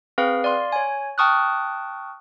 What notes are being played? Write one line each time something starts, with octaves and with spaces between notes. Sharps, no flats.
C4 G#4 B4 F5
D5 F5 C6
C#5 G#5
G5 A5 C#6 D#6 F6 F#6